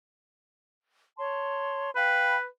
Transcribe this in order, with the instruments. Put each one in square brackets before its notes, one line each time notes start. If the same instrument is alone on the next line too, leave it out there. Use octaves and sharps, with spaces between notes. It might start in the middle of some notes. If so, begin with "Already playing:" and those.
[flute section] C#5 A5 C6
[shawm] B4 [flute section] F5 G5 B5